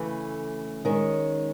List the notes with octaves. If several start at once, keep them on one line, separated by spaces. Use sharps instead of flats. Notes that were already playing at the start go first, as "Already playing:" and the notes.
Already playing: C#3 E3 A3
D#3 G#3 C#4